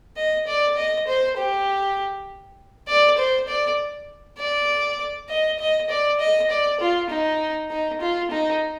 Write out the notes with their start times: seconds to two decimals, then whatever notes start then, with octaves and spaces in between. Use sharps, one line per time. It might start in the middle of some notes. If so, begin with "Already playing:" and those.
0.16 D#5
0.47 D5
0.77 D#5
1.07 C5
1.37 G4
2.88 D5
3.18 C5
3.48 D5
4.38 D5
5.29 D#5
5.59 D#5
5.89 D5
6.20 D#5
6.50 D5
6.80 F4
7.10 D#4
7.70 D#4
8.01 F4
8.31 D#4